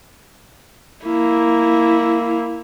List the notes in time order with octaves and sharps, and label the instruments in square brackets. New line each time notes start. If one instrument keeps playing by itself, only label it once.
[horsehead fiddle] A#3 E4